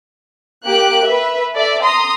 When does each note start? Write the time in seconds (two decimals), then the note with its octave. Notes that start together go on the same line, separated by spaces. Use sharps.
0.65 A#3 G4 F#6 D7
1.04 B4 E5
1.53 A4 D5 E5
1.83 A#5 C6 D#6